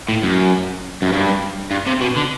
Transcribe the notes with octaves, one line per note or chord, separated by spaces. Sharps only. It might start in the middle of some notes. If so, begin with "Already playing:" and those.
A2
F#2
F#2
G2
G2
C3
B2
D3